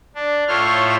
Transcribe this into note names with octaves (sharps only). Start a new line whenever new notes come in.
D4
A2 A3 F4 C5 C#5 F6